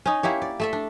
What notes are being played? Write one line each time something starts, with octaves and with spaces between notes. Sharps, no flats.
C#4 D#4
A#3 E4 G4 C#5
D5
A3 A4 E5
D4